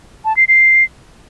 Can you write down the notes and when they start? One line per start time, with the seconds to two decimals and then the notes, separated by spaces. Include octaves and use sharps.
0.25 A5
0.37 C7
0.48 C7